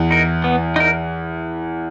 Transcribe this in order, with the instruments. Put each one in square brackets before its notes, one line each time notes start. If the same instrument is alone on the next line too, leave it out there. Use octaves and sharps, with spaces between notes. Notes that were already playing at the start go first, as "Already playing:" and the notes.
Already playing: [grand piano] E2 E3
[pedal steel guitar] D#4 A#4
B3
D#4 A#4